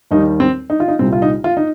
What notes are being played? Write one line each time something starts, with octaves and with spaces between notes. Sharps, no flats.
D#2 D#3 G3 D#4
C4
D#4
F4
D#4
C2 A#2 G3 C4
F4
D#4
F4
D#4